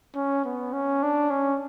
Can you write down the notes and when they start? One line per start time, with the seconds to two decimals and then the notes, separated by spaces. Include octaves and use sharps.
0.15 C#4
0.45 B3
0.73 C#4
1.03 D4
1.30 C#4